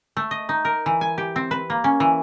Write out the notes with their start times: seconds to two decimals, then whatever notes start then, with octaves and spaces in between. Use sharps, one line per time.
0.17 A3
0.31 D#5
0.49 D#4
0.65 A#4
0.86 E3
1.01 G#5
1.18 G4
1.36 C4
1.51 B4
1.70 A#3
1.84 C#4
2.00 E3